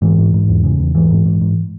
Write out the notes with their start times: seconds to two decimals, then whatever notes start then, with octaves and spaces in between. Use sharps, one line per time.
0.02 G#2 E3
0.18 G#2
0.34 G#2
0.49 E2
0.64 C#3
0.80 E2
0.95 G#2 E3
1.11 G#2
1.25 G#2
1.41 G#2